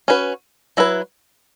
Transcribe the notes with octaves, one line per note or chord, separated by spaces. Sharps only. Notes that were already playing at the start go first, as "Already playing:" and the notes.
C#4 F#4 B4
F#3 E4 B4